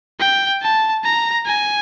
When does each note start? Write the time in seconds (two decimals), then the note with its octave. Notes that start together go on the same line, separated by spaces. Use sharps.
0.20 G5
0.62 A5
1.04 A#5
1.46 G#5